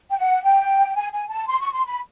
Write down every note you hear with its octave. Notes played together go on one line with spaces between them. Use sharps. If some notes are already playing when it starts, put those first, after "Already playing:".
G5
F#5
G5
G#5
G#5
A5
C6
C#6
C6
B5